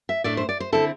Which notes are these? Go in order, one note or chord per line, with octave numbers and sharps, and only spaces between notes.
E5
A2 A3 D4 D5
C5
D5
C5
D3 C4 E4 A4